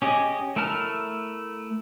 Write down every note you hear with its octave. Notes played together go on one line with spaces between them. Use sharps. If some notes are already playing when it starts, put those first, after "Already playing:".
C#4 G4 G#4 D#5
A3 E4 A#4 A5 F6